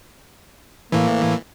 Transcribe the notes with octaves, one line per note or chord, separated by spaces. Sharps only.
A2 E3 A#3